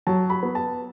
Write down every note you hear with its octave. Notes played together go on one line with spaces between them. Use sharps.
F#3 A5
B5
B3
A5